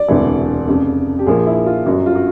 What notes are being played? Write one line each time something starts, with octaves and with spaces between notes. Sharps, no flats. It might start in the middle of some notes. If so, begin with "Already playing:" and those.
Already playing: D5
E1 D2 C3 E3
F1 F2 C#3
G4
A#1 A#2 F3 A#3 G#4
E4
F4
G1 F#2 D3 F#3 F#4
F4
F#4